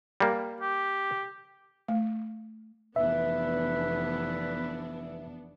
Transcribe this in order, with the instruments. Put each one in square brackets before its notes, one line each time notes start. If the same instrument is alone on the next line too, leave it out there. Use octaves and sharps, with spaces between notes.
[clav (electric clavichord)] G3 A#3
[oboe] G4
[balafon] A3
[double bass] F1 E3 [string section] B3 D4 [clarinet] B4 [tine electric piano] E5